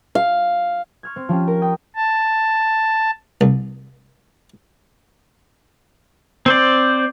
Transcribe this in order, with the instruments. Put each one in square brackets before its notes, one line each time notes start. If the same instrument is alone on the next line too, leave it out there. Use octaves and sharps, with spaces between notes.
[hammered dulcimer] F5
[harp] C#6 F6 G#6
C4
F3 C#4 G4
A#4
G5 D#6
[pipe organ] A5
[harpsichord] C2
[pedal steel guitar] C4 C5 D5